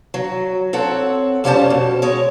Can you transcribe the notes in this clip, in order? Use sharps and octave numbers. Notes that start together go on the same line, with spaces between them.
F#3
C4 A4 C#5 F#5
F2 G3 B3 C#4 C5 A5
B2
G#3 C#5